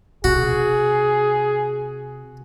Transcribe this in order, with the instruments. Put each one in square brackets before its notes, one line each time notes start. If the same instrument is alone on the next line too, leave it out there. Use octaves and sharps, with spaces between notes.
[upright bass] C3 [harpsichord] F#4 [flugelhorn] G#4